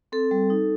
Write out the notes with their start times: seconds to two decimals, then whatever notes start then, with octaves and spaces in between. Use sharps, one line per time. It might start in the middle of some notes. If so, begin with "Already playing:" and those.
0.12 C4 A4
0.31 G3
0.50 D#4